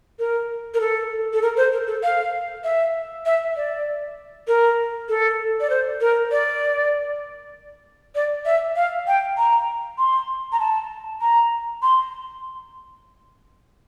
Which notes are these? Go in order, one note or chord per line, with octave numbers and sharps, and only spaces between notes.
A#4
A#4
A4
A4
A#4
C5
A#4
A4
F5
E5
E5
D5
A#4
A4
D5
C5
A#4
D5
D5
E5
F5
G5
A#5
C6
A#5
A5
A#5
C6